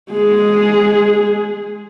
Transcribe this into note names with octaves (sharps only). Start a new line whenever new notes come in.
G#3 G#4